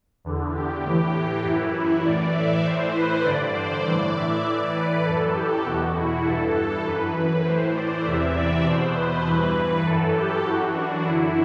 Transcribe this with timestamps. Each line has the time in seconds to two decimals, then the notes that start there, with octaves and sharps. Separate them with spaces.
0.25 E2 D3
0.55 G4
0.84 A2 E3 G4
1.44 F#2 E3 E4
1.75 E4
2.04 A2 E3 D5
2.35 E5
2.64 A2 E3 C5
2.95 B4
3.25 G2 D3 D5
3.55 C5
3.84 A2 E3 D5
4.15 E5
4.44 A2 E3 D5
4.75 B4
5.04 F#2 E3 A4
5.35 G4
5.65 E2 B2 F#4
5.95 E4
6.25 G2 E3 A4
6.55 A4
6.85 F#2 E3 B4
7.15 B4
7.45 A2 E3 C5
7.75 D5
8.05 E2 C3 E3 E5
8.35 D5
8.66 E2 B2 C5
8.95 B4
9.25 G2 E3 B4
9.85 F#2 E3 A4
10.16 G4
10.45 F#2 E3 F#4
10.76 D4
11.05 F#2 D3 E4